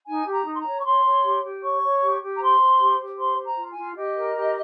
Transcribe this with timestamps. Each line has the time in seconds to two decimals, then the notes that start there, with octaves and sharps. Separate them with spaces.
0.07 D#4 G#5
0.26 G4
0.32 A#5
0.45 D#4
0.54 C6
0.59 A#5
0.66 C#5
0.79 C#6
0.85 C#5 C6
1.04 C#5
1.24 G4
1.43 G4
1.62 C#5 C#6
1.83 C#5
2.02 G4
2.22 G4
2.37 A#5
2.40 C5 C6
2.60 C5
2.80 G4
2.99 G4
3.18 C5 C6
3.38 C5
3.45 A#5
3.57 F4
3.70 G#5
3.77 F4
3.96 G4 D#5
4.17 A#4
4.36 G4